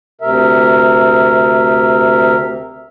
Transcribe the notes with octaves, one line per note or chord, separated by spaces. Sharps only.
D2 C3 A#4 E5